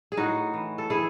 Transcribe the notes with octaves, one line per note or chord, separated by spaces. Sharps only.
G#4
A2 D#4 F#4
E3
A4
E3 E4 G#4